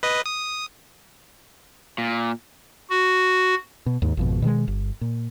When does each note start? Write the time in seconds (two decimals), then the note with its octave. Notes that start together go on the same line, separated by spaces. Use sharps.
0.03 B4 D#5
0.26 D#6
1.98 A#2
2.90 F#4
3.86 B2
4.02 D#2 G#2
4.17 G#1 F2 B2
4.42 B2 D#3 G3 G#3
4.68 G1
5.01 A#2